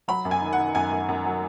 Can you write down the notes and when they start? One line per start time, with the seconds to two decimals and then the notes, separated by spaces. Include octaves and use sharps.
0.08 F#3 B5
0.25 F#2
0.31 G#5
0.42 D#3
0.53 F#5
0.58 D#3
0.75 F#2 G#5
0.91 F#2
1.09 F#2
1.26 F#3